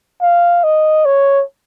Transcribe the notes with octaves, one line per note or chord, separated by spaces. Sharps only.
F5
D#5
C#5